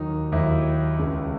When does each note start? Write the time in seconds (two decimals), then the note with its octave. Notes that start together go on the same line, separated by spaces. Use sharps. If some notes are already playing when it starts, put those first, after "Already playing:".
Already playing: D#2 D#3 F#3 D#4
0.32 D#2 D#3 F#3 E4
0.97 C#2 C#3 G#3